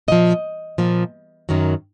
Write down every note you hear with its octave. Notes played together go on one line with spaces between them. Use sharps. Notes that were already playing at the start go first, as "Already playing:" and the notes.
A#2 F3 D#5
A#2 F3
F#2 D#3 F#3